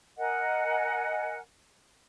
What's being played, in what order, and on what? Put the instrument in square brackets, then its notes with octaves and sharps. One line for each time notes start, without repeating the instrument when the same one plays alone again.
[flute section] A#4 D#5 F#5 G#5